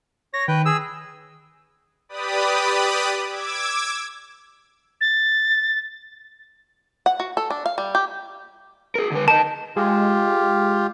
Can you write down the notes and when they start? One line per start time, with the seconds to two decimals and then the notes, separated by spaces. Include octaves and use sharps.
0.34 C#5 A#6
0.48 D#3 B4 G5
0.65 G#4 E6
2.09 G4 B4 D5 B5 D#6
3.27 D6 E6 G#6
5.01 A6
7.06 F#5
7.20 F#4
7.37 A4
7.50 D4
7.66 F5
7.78 G3
7.95 G4
8.95 G#4 A#4
9.12 D3 B4
9.28 A#4 D#5 A5
9.76 G#3 F4 G4